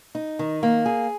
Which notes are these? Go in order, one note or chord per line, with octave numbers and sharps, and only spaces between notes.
D#4
D#3
A#3
G#4